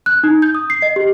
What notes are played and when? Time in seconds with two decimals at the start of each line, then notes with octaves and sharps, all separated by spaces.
0.06 F#6
0.23 D#4
0.42 G6
0.55 D#6
0.70 C7
0.82 D#5
0.96 G4